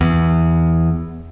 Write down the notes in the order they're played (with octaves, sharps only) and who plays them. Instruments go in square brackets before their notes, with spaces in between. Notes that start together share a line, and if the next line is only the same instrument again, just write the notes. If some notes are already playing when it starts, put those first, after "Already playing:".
[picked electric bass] E2